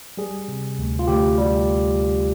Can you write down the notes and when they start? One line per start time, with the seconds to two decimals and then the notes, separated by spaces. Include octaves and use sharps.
0.17 G3 G#4
0.48 C3
0.79 D2
0.99 F4
1.08 D2 G4
1.38 G3